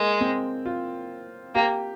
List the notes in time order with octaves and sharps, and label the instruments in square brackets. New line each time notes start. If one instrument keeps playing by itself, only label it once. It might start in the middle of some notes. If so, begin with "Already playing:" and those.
Already playing: [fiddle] G#3 [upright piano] A#3
[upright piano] C4
F4
[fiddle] A#3 [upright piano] G4